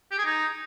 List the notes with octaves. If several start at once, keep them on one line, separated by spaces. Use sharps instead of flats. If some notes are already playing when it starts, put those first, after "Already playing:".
G4
G#4
D#4